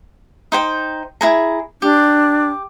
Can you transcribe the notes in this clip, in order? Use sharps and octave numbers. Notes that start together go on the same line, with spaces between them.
D#4 C5 G5
E4 G#4 A#5
D4 G4